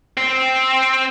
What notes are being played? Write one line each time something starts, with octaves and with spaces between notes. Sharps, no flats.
C4